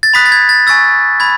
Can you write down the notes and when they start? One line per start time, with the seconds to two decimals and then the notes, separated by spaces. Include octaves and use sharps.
0.03 A6
0.14 B5 D#6 F#6 B6
0.26 A6
0.32 G#6
0.49 A6
0.67 G#5 C#6 E6 A6
1.20 B5 G#6